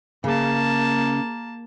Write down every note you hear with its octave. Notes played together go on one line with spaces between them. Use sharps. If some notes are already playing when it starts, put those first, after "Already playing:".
C#3 A#3 A5